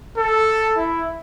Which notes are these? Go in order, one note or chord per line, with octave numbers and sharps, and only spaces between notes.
A4
E4